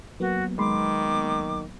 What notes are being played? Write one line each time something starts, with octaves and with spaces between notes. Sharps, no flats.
F#3 A#3 B3 F#4
D#3 G#3 B5 C6 D6